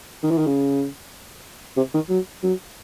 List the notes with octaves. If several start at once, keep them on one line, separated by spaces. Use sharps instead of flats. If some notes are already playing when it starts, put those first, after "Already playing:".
D#3
E3
D#3
C#3
C3
D#3
F#3
F#3